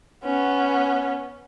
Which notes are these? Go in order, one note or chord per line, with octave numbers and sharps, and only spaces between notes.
B3 C#4